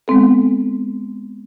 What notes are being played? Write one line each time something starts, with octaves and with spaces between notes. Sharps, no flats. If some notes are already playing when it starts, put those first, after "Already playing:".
G#3 B3 C4 A4